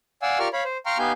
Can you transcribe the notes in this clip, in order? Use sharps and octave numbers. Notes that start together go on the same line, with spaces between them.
D5 F5 F#5 G#5 E6
F4 G4 A#4 D5 C#6 F6
C#5 F5 B5
C5
F5 G5 A#5 C6 C#6 F6
B3 D#4 G4 F5 G#5 G6